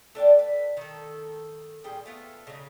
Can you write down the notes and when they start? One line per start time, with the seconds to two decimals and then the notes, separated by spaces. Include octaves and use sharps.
0.15 A3 D4 D5 G5
0.39 B4
0.77 D#3 A4
1.84 A#2 G3 G#4 G5
2.06 A3 B3 F4
2.47 C#3 D#4